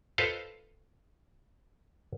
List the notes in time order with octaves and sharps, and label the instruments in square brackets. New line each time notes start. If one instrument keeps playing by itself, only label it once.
[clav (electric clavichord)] F4 A4 B4 C5 D#5 F5